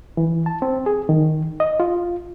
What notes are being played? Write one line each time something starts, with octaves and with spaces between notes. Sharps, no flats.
E3
A5
C4
G#4
D#3
D#5
F4